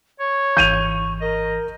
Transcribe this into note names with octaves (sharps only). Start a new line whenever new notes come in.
C#5 C#6
G#1 E3 G6 D#7 F7
A#4 D#5